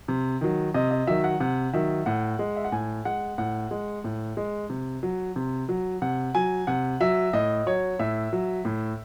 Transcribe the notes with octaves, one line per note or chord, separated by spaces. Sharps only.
C3
D#3 F#3
C3 D#5
D#5
D#3 F#3 E5
F#5
C3 F#5
D#3 F#3 E5
A2 F#5
G#3
E5
F#5
A2 G#5
G#3 F#5
A2 F#5
G#3
A2
G#3
C3
F#3
C3
F#3
C3 F#5
F#3 G#5
C3 F#5
F#3 E5
A2 D#5
F#3 C#5
A2 E5
F#3
A2